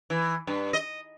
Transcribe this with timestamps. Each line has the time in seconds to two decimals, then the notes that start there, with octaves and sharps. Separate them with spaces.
0.10 E3
0.47 G2
0.73 D#5